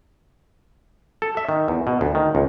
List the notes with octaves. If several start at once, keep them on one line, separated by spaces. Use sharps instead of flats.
A4
E5
D#3
E2
B2
D2
D#3
C#2